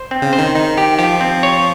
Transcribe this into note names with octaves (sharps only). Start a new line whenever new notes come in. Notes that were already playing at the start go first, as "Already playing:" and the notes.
Already playing: C5
C4
C#3
C5
D#3
D#3 D#4
D#3 G4
F3 G4
C4
C#5